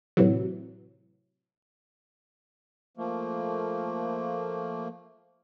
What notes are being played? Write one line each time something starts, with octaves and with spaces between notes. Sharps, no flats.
A2 C3 E3 F#3
F3 A3 A#3